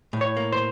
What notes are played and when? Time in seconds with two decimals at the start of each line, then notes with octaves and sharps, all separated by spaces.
0.13 A2
0.21 C#5
0.37 A#3
0.52 C5